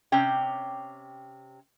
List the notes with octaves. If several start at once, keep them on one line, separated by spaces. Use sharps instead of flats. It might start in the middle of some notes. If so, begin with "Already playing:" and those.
C3 C#4 G5